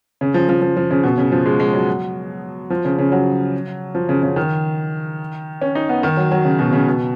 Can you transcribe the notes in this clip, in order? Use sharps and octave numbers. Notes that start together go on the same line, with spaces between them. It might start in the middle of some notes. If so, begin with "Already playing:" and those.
C#3
F3
F3
F3
F3
C#3
B2
C#3
F3
G#3
G#3
F#3
F3
C#3
C#3
F#3
F3
C#3
C#3
D#3
C#4
D#4
B3
D#3
F#3
F#3
C#3
B2
C#3
B2